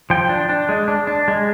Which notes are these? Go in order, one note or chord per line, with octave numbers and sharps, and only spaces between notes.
F3 G5
D4
D4
G#3
D4
D4
G#3